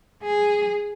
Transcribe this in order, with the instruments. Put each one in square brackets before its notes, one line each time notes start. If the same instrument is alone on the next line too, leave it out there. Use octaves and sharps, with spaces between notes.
[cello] G#4